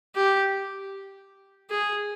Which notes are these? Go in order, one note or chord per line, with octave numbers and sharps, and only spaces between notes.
G4
G#4